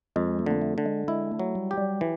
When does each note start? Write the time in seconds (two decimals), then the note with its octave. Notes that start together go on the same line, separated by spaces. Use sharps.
0.16 F2 G#3
0.39 A3
0.46 D3 A#3
0.62 A3
0.78 D3
0.86 G#3
1.08 G#3 E4
1.32 A3
1.39 F#3
1.55 G3
1.71 G4
1.78 G3
2.01 E3